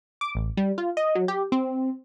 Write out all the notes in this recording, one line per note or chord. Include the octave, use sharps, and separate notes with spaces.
D6
A1
G3
F4
D#5
F#3
G4
C4